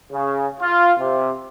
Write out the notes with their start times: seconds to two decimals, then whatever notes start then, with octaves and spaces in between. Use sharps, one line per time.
0.12 C#3
0.61 F4
0.99 C3